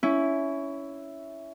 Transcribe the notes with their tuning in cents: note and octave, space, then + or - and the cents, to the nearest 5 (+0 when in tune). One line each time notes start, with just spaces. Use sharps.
C#4 +15 E4 +0